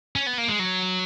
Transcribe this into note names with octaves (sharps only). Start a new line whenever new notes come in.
C#4
B3
A#3
G#3
F#3